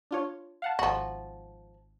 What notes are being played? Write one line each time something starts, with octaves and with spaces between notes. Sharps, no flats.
D4 F4 C#5
F5 F#5 A5
G#1 F3 F#4